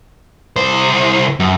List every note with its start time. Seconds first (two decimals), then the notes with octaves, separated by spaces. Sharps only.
0.56 C2 C5
1.40 F#2